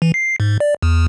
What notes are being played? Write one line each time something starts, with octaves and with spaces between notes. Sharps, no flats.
E3
C7
G#2
D5
E2